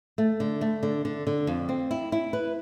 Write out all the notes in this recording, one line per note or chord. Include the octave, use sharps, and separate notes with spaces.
A3
D3
A3
D3
D3
D3
F2
C4
E4
E4
B4